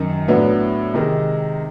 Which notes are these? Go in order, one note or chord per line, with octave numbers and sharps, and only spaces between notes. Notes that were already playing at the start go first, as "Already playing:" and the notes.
Already playing: F#2 D#3
A2 F#3 B3 D4
C3 D#3 G#3